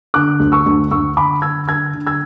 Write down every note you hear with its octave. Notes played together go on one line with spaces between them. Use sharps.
D3 D6 F#6
D2
C#6 E6
D2
D2 C#6 E6
D3 B5 D6
D3 E6 G#6
D3 E6 G#6
D3
E6 G#6